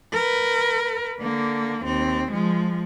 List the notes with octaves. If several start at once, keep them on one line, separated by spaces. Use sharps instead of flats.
A#4 B4
D3 A#3
D#2 C4
F3 G#3